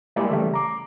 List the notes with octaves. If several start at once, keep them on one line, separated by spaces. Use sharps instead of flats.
G3 G#3 A#3 E4 G4 D5
C#3 E3 G3 A3
A#5 D6